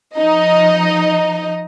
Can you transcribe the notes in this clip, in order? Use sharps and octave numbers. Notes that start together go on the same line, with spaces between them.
F3 D#4 D#5